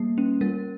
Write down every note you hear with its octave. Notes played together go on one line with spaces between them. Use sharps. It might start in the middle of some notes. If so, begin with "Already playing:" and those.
Already playing: G3 A#3 B3
C#4
G3 A#4